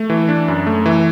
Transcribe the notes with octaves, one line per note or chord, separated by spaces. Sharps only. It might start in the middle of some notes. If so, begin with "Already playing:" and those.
Already playing: A3
E3
D4
F#2
A3
E3